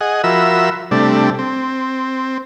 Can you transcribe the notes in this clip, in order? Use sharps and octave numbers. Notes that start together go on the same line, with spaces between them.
G#4 D#5 F#5
F3 F#4 A#4 E5 B5 E6
C3 G3 A3 D4
C4